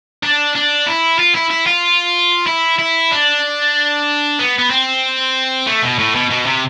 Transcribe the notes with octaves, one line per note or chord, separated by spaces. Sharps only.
D4
D4
E4
F4
E4
E4
F4
E4
E4
D4
B3
B3
C4
A3
B2
A2
B2
B2
C3